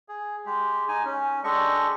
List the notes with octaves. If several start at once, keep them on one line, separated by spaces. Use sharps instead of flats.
G#4
G#3 G4
D#4 G#5
C#4
G#3 D4 G4 A4 D#5 C#6